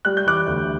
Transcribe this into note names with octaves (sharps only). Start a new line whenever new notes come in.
G3 F#6
G6
E3 D6 F#6
D2